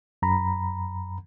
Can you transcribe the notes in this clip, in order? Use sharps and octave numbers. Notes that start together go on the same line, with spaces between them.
F#2 A#5 B5